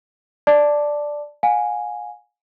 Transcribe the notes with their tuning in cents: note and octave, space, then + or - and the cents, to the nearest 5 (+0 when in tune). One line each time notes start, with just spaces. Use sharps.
D5 +0 A5 +0 D6 +0
F5 +40 G#5 +0